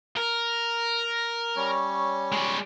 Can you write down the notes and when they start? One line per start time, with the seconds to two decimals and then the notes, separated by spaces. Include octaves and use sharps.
0.17 A#4
1.56 G3 C#4 C#5
2.32 G#3 D5